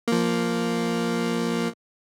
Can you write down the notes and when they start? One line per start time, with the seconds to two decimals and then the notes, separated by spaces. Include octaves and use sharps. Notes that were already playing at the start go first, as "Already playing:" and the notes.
0.08 F3 A#3